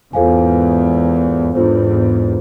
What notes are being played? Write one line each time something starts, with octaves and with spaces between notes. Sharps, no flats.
E2 G#2 F4 A4 C5 F5 G#5
E2 G#2 D4 F4 A4 C5